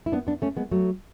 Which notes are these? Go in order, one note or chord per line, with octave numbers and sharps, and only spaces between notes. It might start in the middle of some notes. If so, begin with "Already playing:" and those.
E4
B3 D4
B3 D4
A3 C#4
G#3 B3
F#3 A3